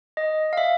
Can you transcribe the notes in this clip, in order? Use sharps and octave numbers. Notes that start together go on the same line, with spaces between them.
D#5
F5
E5